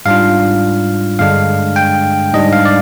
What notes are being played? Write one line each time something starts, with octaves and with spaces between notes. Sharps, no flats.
G#2 G3 D4 F4 F5
G2 D3 G#3 D4 F5
G5
G#2 G3 D4 D#5
F5
D5